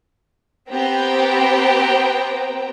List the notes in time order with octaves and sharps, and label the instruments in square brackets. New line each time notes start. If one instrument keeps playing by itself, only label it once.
[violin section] B3 C4 G4 C5 G5 A#5